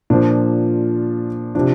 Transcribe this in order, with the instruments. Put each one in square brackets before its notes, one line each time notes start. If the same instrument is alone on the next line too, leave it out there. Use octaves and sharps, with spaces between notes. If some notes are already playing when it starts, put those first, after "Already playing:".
[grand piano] A#2 F3 D4
C3 F3 D4